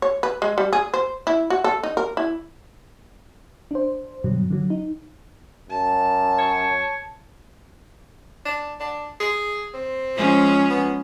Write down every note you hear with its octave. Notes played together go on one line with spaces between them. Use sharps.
C#5
B4
G#3
G3
G#4
C5
E4
F#4
A4
D#4
A#4
E4
D4 C5
G2 B2 D3 F#3
D3 F#3
D#4
F#2 A5
C#5
D4
D4
G#4
C4
F3 G#3 C#4
B3